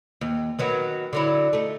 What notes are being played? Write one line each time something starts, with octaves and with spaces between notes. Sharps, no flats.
D#2
D#3 F#3 B3
D3 F#3 E4
A3 D#4